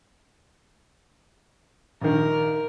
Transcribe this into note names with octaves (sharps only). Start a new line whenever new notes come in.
A#1 D#3 A#4